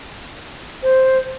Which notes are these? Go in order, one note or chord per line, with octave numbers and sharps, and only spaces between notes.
C5